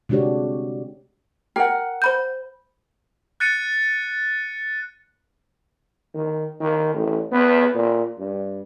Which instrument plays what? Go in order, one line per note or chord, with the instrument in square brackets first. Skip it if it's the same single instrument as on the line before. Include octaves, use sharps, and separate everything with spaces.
[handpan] C3 G#3 D4 F#4 G4 C#5
[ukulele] A#4 F#5 [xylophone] G5
[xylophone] C5 B5 G6
[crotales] F#6 A6 C#7 D#7
[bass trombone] D#3
D#3
A1
B3
A#2
G2